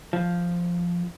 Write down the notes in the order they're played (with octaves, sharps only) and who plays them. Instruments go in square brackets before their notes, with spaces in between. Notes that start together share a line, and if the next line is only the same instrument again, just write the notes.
[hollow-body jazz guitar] F3